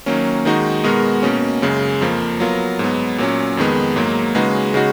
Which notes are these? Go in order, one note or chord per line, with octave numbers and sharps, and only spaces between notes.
D#3 F#3 A#3 C#4
D#3 G#3 D#4 F#4
B2 G#3 B3 F#4 A#4
B2 A#3 C#4
F#2 C#3 G#3
F2 F3 A#3
F#3 B3 F4 A#4
G#2 F#3 B3
A#2 F#3 C#4
F2 D#3 G#3 B3
G#2 F#3 A#3
C#3 G#3 D#4 F#4 B4
C#3 G#3 D#4 F#4